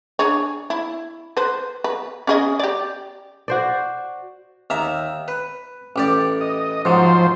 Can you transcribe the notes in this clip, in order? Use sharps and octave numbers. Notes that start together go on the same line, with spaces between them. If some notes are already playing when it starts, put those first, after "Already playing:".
D4 G#4 C#5
E4
B4 C5
B4
C#4 G#4 D#5
G4 D5
F#4 C5 D5
D#2 E5 A#5
B4
A1 G4 D5
D#5
G#2 F3 F#3 C5